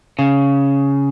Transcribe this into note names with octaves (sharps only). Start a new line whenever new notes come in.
C#3